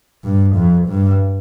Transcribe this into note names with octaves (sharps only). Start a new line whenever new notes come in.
G2
F2
G2